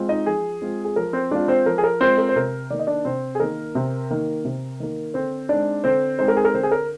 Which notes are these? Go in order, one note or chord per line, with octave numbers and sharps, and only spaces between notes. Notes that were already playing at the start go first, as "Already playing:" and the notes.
Already playing: G#3 C4 F4
D#4 D#5
F3 G#4
G#3 C4 F4
G#4
F3 A#4
C4 C5
G#3 C4 D4 F4 D5
C4 C5
F3 A#4
G#4
A#4
G#3 C4 F4 C5
A#4
C5
C3 A#4
D#3 A#3 D5
D#5
D4 D5
C3 C4 C5
G#4
D#3 A#3 A#4
C3
D#3 A#3
C3
D#3 A#3
D3 C4 C5
G#3 C4 D4 D#4 D5
D3 C4 C5
G#3 C4 D#4 C5
A#4
G#4
A#4
D3 C4 C5
G#4
A#4